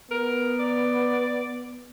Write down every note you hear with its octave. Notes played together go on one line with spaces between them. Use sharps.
B3 A#4
D5